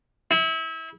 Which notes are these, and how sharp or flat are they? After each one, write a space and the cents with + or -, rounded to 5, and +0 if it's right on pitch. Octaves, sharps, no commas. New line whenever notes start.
E4 -30